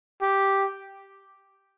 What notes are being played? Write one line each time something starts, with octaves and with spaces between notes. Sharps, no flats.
G4